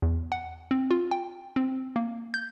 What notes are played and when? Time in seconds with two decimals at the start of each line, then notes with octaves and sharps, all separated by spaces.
0.02 E2
0.32 F#5
0.71 C4
0.91 F4
1.11 G5
1.56 C4
1.96 A#3
2.34 G6